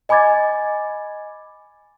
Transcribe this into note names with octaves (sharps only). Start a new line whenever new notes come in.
D#5 G#5 B5 D6 G#6 A6